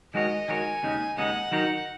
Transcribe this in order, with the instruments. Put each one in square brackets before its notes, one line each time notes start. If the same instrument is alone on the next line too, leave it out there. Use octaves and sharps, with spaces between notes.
[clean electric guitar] D#3 G#3 F#4 A#4 C#5 [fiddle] D#5
[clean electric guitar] D#3 G#3 F#4 A#4 C#5 [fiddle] G#5
[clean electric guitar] D#2 C#3 G#3 D#4
[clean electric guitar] D#2 C#3 G#3 D#4 [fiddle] F#5
[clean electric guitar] D#3 F#3 D#4 A#4 C#5